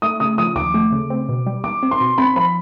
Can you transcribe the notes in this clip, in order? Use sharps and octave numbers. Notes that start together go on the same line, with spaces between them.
A3 D#6
C#3 D#6
F3 D#6
D#2 D6
A3
C#3
C4
B2
G3
E2 D6
C4
C6
B2
C4 B5
F3 B5